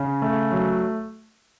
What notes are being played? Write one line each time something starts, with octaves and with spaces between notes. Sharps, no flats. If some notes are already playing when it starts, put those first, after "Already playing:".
Already playing: C#3 C#4
A3
F#3